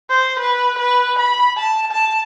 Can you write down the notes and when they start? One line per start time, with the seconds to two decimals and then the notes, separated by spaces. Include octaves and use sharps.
0.10 C5
0.39 B4
0.78 B4
1.19 B5
1.57 A5
1.92 A5